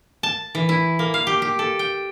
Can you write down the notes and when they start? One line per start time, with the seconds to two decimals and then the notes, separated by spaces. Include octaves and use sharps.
0.23 A5
0.55 E3
0.69 E4
0.99 A#3
1.14 F5
1.27 G4
1.42 G4
1.59 A4
1.79 G5